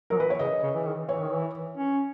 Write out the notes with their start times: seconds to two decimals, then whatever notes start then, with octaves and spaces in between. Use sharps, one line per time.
0.10 F#3 A#4
0.17 E3
0.20 B4
0.30 C#5
0.39 C#3 D#5
0.63 C#3
0.75 E3
0.86 D#3
1.09 E3 C#5
1.21 D#3
1.32 E3
1.77 C#4